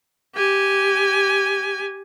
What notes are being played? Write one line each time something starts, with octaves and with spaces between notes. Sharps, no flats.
G4 G#5